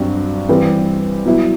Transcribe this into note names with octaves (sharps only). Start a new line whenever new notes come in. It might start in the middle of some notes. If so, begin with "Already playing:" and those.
Already playing: G2 F#3 C4 F#4
E3 G3 C4 G4 B4
F#3 B3 E4